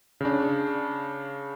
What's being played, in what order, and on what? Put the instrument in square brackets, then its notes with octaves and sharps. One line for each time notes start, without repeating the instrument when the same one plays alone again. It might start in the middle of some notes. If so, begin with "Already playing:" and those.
[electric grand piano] C#3 D4